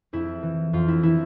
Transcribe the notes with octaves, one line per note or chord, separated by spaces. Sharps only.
F2 E4
E3
F2 F4
E4
E3 E4